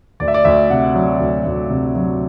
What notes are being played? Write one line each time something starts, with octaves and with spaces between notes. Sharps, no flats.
D2 D5
E5
D5
D2 E5
C3 F#5
F#3
D2
D2
C3
F#3